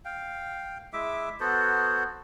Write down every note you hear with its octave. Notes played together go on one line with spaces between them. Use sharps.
F5 G5
G#3 E4 E5 D6
B3 F#4 A4 C5